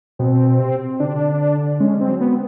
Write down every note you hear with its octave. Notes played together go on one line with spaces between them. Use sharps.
B2 C4
C3
D3 D4
G#3 C#4
C4
F#3
B3